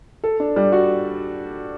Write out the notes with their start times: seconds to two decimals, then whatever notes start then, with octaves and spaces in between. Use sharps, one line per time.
0.24 A4
0.40 D4
0.56 G3
0.72 F#4